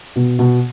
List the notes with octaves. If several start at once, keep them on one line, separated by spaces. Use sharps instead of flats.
B2
B2